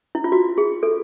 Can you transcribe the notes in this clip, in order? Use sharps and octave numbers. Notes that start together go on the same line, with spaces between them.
E4
F4
F#4
G#4
A4